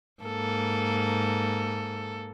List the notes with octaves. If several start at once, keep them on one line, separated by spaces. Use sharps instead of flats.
G#2 A#3 A4